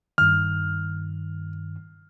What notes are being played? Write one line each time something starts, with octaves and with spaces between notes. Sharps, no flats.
G2 D#3 F6